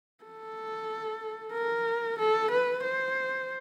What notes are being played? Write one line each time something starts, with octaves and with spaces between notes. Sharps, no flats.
A4
A#4
A4
B4
C5